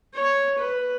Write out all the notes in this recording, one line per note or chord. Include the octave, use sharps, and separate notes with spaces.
C#5
B4